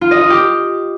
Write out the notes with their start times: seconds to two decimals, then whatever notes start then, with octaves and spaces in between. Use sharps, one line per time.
0.01 F4
0.11 D#5
0.21 F4
0.30 G4